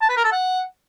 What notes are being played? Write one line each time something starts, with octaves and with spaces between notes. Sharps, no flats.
A5
B4
A#4
A4
F#5